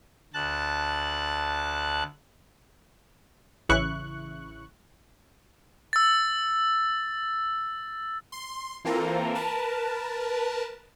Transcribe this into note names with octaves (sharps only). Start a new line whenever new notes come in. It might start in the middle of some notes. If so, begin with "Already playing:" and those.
D2 A5 F#6
A1 C#3 E3 E4 C#6 F#6
E6 A6
C6
E3 A#3 C4 F4 A4 A#4
A#4 B4 A5